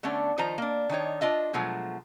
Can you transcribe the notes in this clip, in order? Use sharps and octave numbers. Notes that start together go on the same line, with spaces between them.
D3 A3 B3 C#4 D4
D#3 F3 C5 D#5 A#5
A#3 D4
D#3 D4 D#4 C#5
D4 F4 D#5 E5
B2 F3 F#3 G#3 A3